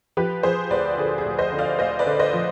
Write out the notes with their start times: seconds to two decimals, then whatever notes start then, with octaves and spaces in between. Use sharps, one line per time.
0.17 F3 G4 B4
0.43 F3 G#4 C5
0.70 D2 B4 D5
0.98 D3 G#4
1.18 G#4
1.25 D2
1.38 C5 D#5
1.52 D3
1.59 D5 F5
1.79 D2 C5 D#5
1.99 B4 D5
2.06 D3
2.19 C5 D#5
2.33 F3